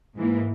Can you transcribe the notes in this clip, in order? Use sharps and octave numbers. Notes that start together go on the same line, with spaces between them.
G#2 E3 A#3